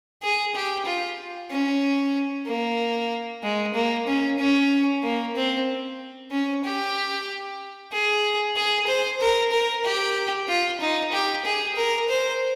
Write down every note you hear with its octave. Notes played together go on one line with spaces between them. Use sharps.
G#4
G4
F4
C#4
A#3
G#3
A#3
C#4
C#4
A#3
C4
C#4
G4
G#4
G#4
C5
A#4
A#4
G4
F4
D#4
G4
G#4
A#4
C5